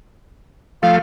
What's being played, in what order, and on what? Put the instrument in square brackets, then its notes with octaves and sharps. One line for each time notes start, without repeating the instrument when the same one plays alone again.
[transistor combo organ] F3 A3 [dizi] F5